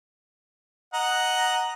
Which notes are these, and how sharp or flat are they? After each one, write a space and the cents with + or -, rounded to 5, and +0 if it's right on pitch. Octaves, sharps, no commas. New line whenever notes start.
D#5 +0 F#5 +0 A#5 +0